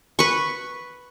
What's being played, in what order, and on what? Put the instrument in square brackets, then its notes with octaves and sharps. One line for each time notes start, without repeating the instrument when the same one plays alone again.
[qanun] B4 C#6